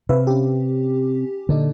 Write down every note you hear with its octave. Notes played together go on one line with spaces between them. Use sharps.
C3 B4 E5 F5
C#4 G4
A#2 D3 D4 D#4